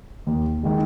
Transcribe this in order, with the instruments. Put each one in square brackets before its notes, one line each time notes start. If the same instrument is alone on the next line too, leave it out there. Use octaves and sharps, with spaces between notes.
[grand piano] D#2
D#3 G#3